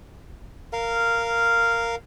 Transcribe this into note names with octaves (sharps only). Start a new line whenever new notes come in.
A#4 F5